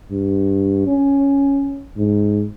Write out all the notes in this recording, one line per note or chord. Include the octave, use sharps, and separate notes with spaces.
G2
C#4
G#2